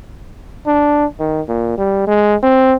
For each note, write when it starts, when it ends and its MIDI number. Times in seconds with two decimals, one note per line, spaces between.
0.67 1.05 62
1.19 1.41 51
1.48 1.77 46
1.78 2.03 55
2.07 2.35 56
2.43 2.75 60